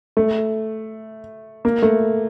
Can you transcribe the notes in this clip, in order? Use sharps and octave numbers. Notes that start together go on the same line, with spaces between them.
A3
A#3
A3